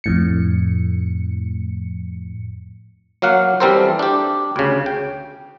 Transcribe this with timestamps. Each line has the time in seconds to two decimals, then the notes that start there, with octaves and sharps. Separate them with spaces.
0.04 F2 A2 C#7
3.22 F#3 A#3 F5 F#5
3.60 E3 G3 C4 A4 A#4 C5
3.99 D4 G4
4.56 D2 C#3
4.86 G5